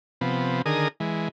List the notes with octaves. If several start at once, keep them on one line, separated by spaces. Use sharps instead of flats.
C3 F3 B3
D3 D#3 G#4 A#4 D#6
E3 G#3